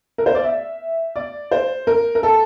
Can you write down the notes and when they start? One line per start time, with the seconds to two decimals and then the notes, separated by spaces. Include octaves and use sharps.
0.18 A#4
0.26 C5
0.35 D5
0.44 E5
1.16 D5
1.51 C5
1.87 A#4
2.15 A#4
2.23 A4